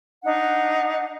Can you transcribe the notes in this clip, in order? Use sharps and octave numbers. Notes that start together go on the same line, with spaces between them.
D4 D#4 F#5